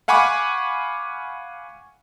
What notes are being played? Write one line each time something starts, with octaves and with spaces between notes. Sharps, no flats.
F5 F#5 G#5 B5 C#6 D6